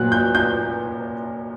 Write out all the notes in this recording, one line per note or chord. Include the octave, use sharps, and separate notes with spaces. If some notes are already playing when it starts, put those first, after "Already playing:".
Already playing: A#2 F#3 A#3 F#6
G6
G6